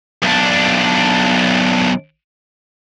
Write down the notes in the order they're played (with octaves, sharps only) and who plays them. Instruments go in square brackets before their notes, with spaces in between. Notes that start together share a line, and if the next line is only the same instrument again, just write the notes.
[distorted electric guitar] B1 D4